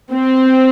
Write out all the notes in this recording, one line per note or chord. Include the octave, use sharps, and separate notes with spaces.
C4